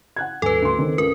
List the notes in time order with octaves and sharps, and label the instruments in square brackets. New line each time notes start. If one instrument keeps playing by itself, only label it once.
[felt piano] F#5 F#6 G#6
[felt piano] D#1 G#5 [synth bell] A4 B4
[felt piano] D2 C6
D#3 C4
[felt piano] C#2 [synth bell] A#4